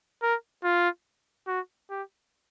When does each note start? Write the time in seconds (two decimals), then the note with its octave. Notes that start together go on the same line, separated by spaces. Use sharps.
0.22 A#4
0.64 F4
1.48 F#4
1.90 G4